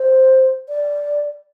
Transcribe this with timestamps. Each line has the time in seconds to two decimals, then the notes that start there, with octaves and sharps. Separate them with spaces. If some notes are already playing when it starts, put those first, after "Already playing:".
Already playing: C5
0.68 D5